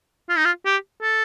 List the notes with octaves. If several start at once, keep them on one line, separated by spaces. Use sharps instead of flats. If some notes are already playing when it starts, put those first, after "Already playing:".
F4
D#4
F4
G4
A4